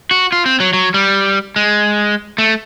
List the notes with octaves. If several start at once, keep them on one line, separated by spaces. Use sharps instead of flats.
F#4
F4
C4
F#3
F#3
G3
G#3
A3